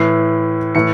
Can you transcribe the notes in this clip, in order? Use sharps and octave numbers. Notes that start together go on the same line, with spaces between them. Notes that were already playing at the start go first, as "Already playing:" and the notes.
Already playing: A2 E3 C7
A2 E3 C#7